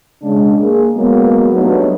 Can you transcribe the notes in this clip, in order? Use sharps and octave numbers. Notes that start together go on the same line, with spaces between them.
C#3 G#3 D4
A#3 G#4
F#3 G#3 A#3 B3
F#3 G3 A3 B3 D4 D#4